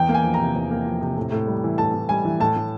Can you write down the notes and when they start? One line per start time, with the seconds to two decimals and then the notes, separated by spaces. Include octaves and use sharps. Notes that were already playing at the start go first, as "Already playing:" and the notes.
Already playing: E2 G5
0.09 A#3
0.14 G#5
0.24 F3
0.34 A#5
0.39 C3
0.56 E2
0.71 A#3
0.86 F3
1.01 C3
1.17 A2
1.32 A2
1.47 G3
1.64 E3
1.78 A2 A5
1.94 A2
2.09 G3 G#5
2.25 E3
2.40 A2 A5
2.56 A2